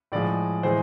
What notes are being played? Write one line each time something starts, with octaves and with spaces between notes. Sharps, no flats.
A2 F3 G#3 D5
A2 E3 G#3 C5